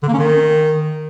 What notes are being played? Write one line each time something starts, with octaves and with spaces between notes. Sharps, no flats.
D3
A#3
C#4
D#3